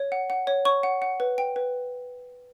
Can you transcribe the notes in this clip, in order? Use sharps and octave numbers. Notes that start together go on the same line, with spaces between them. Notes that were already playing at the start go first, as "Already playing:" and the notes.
Already playing: C#5
F#5
F#5
C#5
C#5 C#6
F#5
F#5
B4
G5
B4